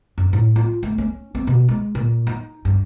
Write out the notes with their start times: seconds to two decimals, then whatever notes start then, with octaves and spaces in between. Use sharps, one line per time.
0.18 F#2
0.33 A2
0.56 F4
0.83 A3
0.98 C#4
1.35 C4
1.47 B2
1.69 G#3
1.95 A#2
2.27 D#4
2.65 G2